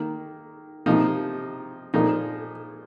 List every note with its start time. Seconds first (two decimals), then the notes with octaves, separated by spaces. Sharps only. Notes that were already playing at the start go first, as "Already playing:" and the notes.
Already playing: D#3 A#3
0.86 C3 F3 A#3 D#4
1.94 A#2 F3 A#3 D#4